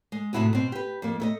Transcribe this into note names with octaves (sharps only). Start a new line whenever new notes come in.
G#3
A2 C3 G#3 E4 F#4 G#4
B2 C4
G4 B4
F2 A#3
A3 A4 D#5